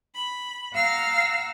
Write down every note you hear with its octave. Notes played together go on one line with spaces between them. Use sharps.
B5
F5 F#5 A#5 E6 F6